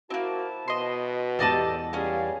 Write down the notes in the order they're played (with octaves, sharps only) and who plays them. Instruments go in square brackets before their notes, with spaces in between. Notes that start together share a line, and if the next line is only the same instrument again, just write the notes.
[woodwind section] F3 E4 A5 [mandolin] A#3 C4 [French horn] F#4
[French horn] B2 [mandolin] D#5 C6
[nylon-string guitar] E2 A5 [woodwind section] G3 G4 [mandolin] A4 D5 D#5
[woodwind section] C#2 F5 [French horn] G3 [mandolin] C#4 G#4